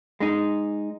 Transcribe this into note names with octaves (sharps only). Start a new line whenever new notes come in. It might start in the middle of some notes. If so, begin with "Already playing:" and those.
G#3 D#4